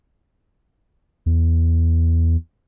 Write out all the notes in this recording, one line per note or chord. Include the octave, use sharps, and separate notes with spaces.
E2